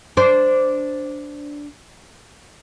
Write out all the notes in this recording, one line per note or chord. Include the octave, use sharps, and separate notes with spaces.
D4 C5